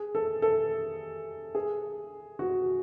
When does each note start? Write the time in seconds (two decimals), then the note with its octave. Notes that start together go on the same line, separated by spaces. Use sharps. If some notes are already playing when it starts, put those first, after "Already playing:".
Already playing: G#4
0.15 A4
0.42 A4
1.55 G#4
2.39 F#4